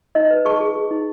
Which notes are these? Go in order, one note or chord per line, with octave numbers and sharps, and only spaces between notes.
D#4 D#5
B4
G#4 A5 C#6
G#4
G#4
D#4